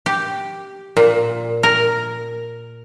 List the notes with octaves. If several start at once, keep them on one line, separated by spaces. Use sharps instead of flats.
G4
A#2
A#4